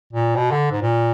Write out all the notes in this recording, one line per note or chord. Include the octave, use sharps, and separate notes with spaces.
A#2
B2
D3
G#2
A#2